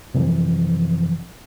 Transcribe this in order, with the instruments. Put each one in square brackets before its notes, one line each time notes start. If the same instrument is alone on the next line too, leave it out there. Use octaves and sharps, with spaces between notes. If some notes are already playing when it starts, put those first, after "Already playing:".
[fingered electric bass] F#2 C3 E3 F3